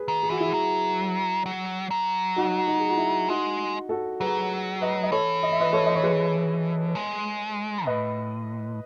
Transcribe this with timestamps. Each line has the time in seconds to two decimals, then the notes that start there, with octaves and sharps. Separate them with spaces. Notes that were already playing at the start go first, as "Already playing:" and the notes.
Already playing: G#4 B4
0.08 D#3
0.23 G#4
0.30 E3 F#4
0.40 E4 G#4
0.54 F#3
1.46 F#3
1.91 F#3
2.36 D#4 F#4
2.67 D#4 F#4
2.80 G#4
2.89 F#4
2.97 E4
3.29 G#3 D#4 F#4
3.89 F#4 A4
4.21 F#3 G#4 B4
4.81 B4 D#5
5.03 D#5
5.11 E3 A4 C#5
5.43 D#5
5.52 E5
5.60 B4 D#5
5.73 A4 C#5
5.86 D#5
5.95 C#5
6.03 G#4 B4
6.95 G#3
7.87 A2 B4 D#5